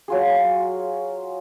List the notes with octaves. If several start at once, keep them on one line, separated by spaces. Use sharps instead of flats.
F#3 F4 G#4